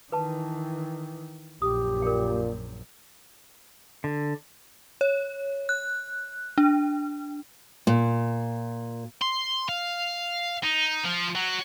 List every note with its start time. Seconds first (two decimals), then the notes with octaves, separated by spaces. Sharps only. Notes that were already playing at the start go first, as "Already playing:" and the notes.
0.12 D#3 E3 B4 A5
1.62 A#1 F#2 G4 D#6
2.02 A#2 A#4 G5
4.04 D3
5.01 C#5
5.69 F#6
6.58 D4
7.87 A#2
9.22 C6
9.69 F5
10.63 D#4
11.04 F3
11.35 F#3